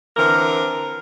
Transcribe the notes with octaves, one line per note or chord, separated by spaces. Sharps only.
D3 E3 C4 A#4